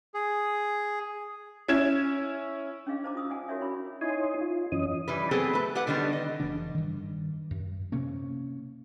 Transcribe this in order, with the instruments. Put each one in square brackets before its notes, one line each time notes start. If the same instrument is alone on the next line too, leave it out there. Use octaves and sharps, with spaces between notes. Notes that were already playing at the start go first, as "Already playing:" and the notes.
[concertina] G#4
[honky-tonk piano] C#4 E4 G#6 E7
[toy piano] C#4 D4 G#4 D#5 F5
D#4 C5 D#5 A5 A#5 D6
F4 D#6 E6
D#4 D5 D#5 F#5 G#5 A5
F4 F#4 A#4 C#5 D5 E5
C#4 E4 B5
[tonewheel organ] D#4 E4 C#5 G#5 C6 D#6
F4
F#2 E3 C#4 D#5 D#6
[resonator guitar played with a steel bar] E3 G3 B4
F#3 B3 C4 G#4 A4 B4
A3 B4
G4 B4 F#5
D3 D#3 G3 B3 D4
D#5
[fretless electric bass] F1 C#3 E3 D4
G2 D#3
F#2
C3 A#3 C#4